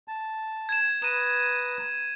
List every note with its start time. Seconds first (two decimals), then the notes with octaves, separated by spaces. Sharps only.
0.08 A5
0.69 G#6 E7
1.02 B4 A#5 D#6 D#7 E7